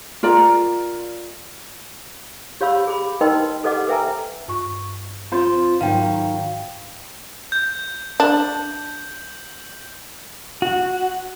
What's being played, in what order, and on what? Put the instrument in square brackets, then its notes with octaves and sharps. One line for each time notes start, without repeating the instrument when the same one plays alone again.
[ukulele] F4 A#4 D5 A#5
[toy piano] G4 C#5 F5 B5 E6
G#4 B5
D#4 A#4 B4 D#5 G5 C6
G4 A4 B4 D#5 F#5 D6
A#4 B4 E5 G5 G#5 A#5
[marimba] G2 C#6
[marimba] C4 [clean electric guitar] F4 C5
[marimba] G#2 [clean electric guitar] D#3 F#3 [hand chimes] F5 G5
[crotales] G6
[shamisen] D4 [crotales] F#7
[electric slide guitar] F#4